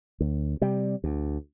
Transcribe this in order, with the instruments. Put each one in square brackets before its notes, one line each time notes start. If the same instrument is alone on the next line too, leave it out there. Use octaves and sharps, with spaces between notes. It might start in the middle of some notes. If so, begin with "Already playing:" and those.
[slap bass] D2
C3 G3
D2